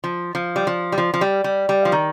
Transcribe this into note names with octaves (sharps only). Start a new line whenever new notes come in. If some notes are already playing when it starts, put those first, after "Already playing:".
F3
F3
G3
F3
G3
F3
F3
G3
G3
G3
F3
D#3